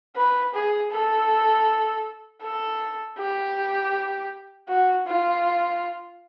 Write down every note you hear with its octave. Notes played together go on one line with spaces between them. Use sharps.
B4
G#4
A4
A4
G4
F#4
F4